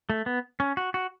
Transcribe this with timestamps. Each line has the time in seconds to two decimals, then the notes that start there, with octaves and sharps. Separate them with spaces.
0.10 A3
0.26 B3
0.60 C#4
0.77 F#4
0.94 F#4